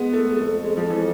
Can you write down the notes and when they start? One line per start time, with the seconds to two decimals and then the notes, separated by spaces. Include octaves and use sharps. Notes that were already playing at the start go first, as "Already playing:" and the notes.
Already playing: G#3 B3
0.13 A3
0.37 F2 A3
0.64 G#3
0.77 F3
0.90 E3